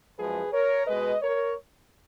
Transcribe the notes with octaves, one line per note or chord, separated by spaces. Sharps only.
F#2 F3 G#3 G#4 B4
A#4 C#5
B2 G#3 B4 D#5
A#4 C#5